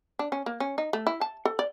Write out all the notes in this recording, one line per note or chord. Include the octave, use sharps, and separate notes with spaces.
D4
C#4
A#3
C#4
D#4
A3
E4
A5
A4
D5